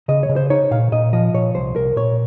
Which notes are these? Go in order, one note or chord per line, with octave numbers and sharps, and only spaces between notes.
C#3 D#5
C#5
C#3
C5
D#4 C#5
A#2 F5
A#2 D#5
F3 D#5
A#2 C#5
C2 C5
C2 A#4
A#2 C#5